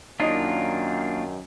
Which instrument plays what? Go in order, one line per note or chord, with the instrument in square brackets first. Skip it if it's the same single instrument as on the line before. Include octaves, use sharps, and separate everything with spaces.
[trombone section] F#2 D#3 [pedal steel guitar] A#3 D4 F4 [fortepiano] D#4 C#5 D#5